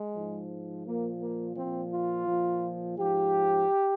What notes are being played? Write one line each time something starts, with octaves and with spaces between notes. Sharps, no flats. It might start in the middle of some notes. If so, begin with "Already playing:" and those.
Already playing: G#3
G#2 F3
A#2 F3 A#3
A#3
A#2 F3 C4
F4
A#2 F3
G#2 F3 G4